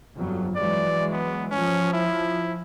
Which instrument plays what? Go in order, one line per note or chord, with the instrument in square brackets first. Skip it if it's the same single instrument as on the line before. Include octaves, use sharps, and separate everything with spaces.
[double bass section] G1 F2 F#3
[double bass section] E3 F#3 G#3 [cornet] D5
[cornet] B3
[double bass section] F3 [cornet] C#4
[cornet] E4